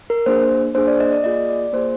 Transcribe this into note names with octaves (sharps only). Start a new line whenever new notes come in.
A#4
A#3 D4 G#4 C5
A#3 D4 G#4 C5
D5
D#5
D5
A#3 F4 G#4 D#5
D5
A#3 F4 G#4 C5